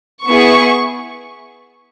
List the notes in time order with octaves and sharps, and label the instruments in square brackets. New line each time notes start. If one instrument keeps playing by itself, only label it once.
[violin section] B3 E4 G#4 C#6